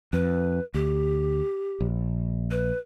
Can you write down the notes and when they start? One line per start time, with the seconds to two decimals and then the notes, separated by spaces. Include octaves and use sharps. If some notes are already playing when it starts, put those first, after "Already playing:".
0.13 F2 B4
0.74 D2 G4
1.81 A#1
2.51 B4